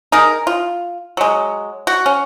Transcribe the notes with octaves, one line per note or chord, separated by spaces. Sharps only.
D#4 G#4 A#4
F4
F#3 G#3
F#4
C#4